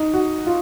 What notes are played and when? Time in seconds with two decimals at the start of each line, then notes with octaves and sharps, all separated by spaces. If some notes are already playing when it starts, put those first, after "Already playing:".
Already playing: D#4
0.14 F#4
0.46 F4